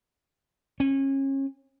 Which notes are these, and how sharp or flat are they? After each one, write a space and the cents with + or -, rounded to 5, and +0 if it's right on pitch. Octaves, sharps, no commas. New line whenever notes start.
C#4 -30